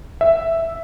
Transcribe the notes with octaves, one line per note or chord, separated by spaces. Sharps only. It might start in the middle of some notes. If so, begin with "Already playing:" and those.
E5